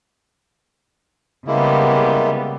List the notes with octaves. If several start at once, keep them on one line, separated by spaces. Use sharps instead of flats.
C#3 G3 G#3 A#3 B3 E4